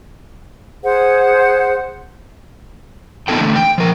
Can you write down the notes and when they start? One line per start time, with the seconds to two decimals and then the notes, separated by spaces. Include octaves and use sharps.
0.83 G#4 C5 F#5
3.28 B3 D#4 F4 A4 G5
3.41 D3 E3 A3
3.56 G5
3.78 F3 A#4